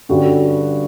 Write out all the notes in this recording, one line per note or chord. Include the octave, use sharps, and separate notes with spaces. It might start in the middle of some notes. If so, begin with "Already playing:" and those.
G2 D3 G3 C#4 F#4